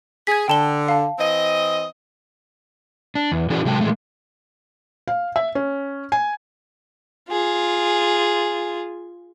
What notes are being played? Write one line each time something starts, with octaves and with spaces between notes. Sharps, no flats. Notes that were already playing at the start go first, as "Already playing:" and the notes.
G#4 G#6 B6
D3 G5 A5 G7
F5 A5
E3 C4 D#5
D4
E2
E3 C#4 E4 F#4 G#4 D5
C3 F#3 G#3 G5 A5
A#2 C#3 E3 G#3 A3
F5
E5
C#4
G#5
F4 G#4